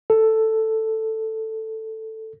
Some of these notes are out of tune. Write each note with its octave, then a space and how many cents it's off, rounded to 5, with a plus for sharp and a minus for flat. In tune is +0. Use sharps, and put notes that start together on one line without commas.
A4 +5